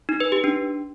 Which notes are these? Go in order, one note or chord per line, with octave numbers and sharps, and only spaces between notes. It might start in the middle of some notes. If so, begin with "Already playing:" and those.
D#4
B4
G4
D4